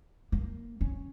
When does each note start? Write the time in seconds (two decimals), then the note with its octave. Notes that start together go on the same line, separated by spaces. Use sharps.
0.32 A#3
0.81 C#4